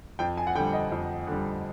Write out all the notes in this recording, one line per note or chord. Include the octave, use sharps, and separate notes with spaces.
F2 G5
G#5
F#5
D3 G3 G5
D#5
F2
D3 G3